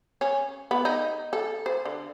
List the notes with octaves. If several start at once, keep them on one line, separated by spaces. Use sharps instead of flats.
C#4
B3
D#4
A4
C5
D3